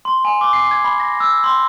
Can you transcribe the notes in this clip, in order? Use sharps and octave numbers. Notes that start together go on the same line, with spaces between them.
C6
G#5
D6
C7
G#6
B5
A#6
E6
C6